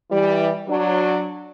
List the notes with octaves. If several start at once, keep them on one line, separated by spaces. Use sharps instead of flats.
E3 G3
F#3 D4